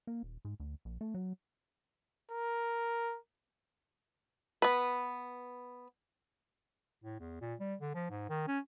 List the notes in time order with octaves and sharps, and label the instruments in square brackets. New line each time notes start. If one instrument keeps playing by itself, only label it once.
[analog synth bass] A#3
D#1
G#2
D2
A#1
A3
F#3
[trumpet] A#4
[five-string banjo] B3 B4
[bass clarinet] A2
E2
A#2
G3
D3
F3
G#2
D#3
C#4